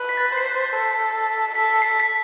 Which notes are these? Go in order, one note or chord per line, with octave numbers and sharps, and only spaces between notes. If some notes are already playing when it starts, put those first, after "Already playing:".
Already playing: B4
B6
A6
C5
C7
B6
A4
A4 B6
C7
B6